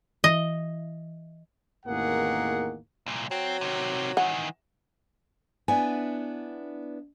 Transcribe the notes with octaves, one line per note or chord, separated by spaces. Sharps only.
E3 D#5
A1 E2 D#3 A#3 G#4 F#5
C2 A#2
F#3 C4
C3 D#3
D#3 E3 F#5
B3 D4 E4 G#5